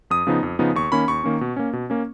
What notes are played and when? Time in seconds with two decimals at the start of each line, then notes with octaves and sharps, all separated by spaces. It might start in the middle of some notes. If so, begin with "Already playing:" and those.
0.10 F2 D#6
0.27 C#3 F3 B3 D#4
0.43 F2
0.59 C#3 F3 B3 D#4
0.75 D#2 C#6
0.92 D#3 A#3 C#4 B5
1.08 D#2 C#6
1.24 D#3 A#3 C#4
1.41 B2
1.56 A#3 C#4
1.73 B2
1.90 A#3 C#4